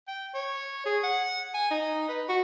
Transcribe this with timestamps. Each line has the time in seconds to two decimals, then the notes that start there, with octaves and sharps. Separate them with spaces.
0.08 G5
0.34 C#5
0.85 G#4
1.04 F#5
1.54 G#5
1.71 D#4
2.09 B4
2.29 F#4